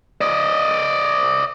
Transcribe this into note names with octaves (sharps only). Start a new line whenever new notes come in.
D5 D#5